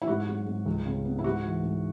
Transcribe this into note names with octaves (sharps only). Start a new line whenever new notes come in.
E4
G#2 F#4
F#3
G#2
C#2
C#3
B3
E4
G#2 F#4
E3
G#2